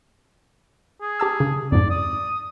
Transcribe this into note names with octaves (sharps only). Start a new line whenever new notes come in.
G#4
G4 A5 E6
C#3
F2 G#2 D5
D#6